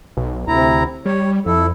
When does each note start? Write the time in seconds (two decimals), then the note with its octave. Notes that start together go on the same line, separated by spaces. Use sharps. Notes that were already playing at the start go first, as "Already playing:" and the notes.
0.17 B1
0.48 D2 C3 E4 A#5
1.05 G3 C#5
1.46 F2 E4 A4